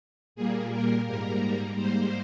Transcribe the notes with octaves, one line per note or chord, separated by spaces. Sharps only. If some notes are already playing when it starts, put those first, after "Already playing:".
A#2 G3 A#3 G#4
A#4
G#2 G3 A#3 A#4
G#2 G3 A#3 C5